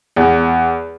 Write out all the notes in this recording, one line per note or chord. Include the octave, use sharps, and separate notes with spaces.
E2